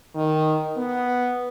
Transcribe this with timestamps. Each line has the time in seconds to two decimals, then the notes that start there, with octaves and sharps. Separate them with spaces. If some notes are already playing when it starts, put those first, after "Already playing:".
0.15 D#3
0.77 B3